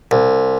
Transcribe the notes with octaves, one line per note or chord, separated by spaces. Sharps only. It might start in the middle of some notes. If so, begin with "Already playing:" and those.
C2